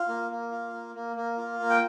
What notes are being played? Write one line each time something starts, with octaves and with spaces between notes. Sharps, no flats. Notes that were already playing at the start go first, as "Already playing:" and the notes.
Already playing: F4
A#3
A#3
F4
A#3
A#3
A#3
F4
A#3
G5